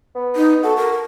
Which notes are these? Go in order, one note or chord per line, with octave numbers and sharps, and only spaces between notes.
B3
D#4
F#4 A4
A#4